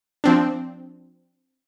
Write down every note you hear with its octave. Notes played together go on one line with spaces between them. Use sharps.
F3 C4 D4